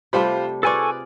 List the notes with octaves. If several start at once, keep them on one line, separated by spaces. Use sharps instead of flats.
C3 G3 A3 F4 C5 B5
F4 G#4 A4 B4 D5 G#5 C#6